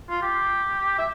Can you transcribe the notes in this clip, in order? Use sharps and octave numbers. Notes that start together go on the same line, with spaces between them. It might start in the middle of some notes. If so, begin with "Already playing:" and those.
F4
G4
E5